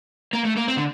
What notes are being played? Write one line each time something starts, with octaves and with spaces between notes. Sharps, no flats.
A#3
A3
A#3
C4
D3